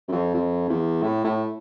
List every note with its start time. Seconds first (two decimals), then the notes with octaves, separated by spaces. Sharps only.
0.08 F#2
0.12 F2
0.34 F2
0.69 E2
1.02 A2
1.24 A2